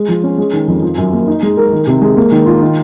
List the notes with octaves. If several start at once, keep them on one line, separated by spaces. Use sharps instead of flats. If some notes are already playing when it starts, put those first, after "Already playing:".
Already playing: G#3
F3
C#4
G#3
D#3
F2
F3
F#2
A#3
D#4
G#3
A#4
D#3
C3
G#3
A#3
D#3
F4
D#3